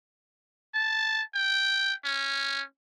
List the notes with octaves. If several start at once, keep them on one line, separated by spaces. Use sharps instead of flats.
A5
G5
C#4